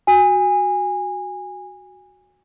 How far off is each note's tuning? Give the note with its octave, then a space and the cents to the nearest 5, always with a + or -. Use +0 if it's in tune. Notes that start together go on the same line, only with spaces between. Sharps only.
F#4 +0 G#5 -20